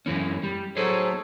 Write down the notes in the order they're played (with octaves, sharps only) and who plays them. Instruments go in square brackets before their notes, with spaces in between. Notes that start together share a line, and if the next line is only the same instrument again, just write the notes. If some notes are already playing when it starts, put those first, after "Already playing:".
[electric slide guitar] F#2 E3 C#4
G3
[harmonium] F#3 A4 C#5 [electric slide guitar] G#4 C5